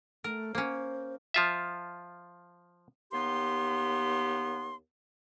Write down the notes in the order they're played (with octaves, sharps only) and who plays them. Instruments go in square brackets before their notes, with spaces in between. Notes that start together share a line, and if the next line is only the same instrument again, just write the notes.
[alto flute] A3 [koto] A#4
[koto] A#3 C#4 [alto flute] C5
[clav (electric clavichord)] F3 F4 E5
[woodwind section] D#2 B3 G4 C6